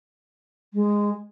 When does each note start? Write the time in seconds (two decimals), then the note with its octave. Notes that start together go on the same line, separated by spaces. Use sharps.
0.74 G#3